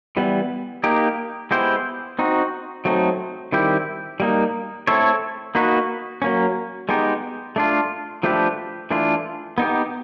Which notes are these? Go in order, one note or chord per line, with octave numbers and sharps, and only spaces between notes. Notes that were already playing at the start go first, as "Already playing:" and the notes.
E3 G3 B3
A#3 D#4 G4
G#3 B3 E4 G4 C5
C4 D#4 F#4
F#3 A3 C4 D#4
D#3 G3 C4 E4 G4
G3 A#3 D#4
A3 C4 E4 A4 C#5
A#3 D#4 F#4 B4
F#3 A#3 C#4
G#3 B3 D#4 G4
A3 D4 F4
F3 A3 D4 G4 B4
E3 A3 D4 F4
B3 D#4 G4